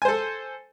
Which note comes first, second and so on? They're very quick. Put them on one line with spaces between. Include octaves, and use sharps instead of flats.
G#5 C5 A4